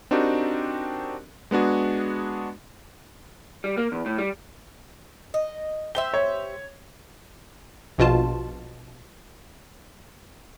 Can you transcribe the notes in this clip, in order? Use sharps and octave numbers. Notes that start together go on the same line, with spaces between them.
C4 D4 D#4 F#4 G4 A#4
G#3 B3 D4 F#4 G#4
G3
A#3
E2
A2
G3
D#5
G4 C5 E5 G7
C#5
A#1 B2 F4 A5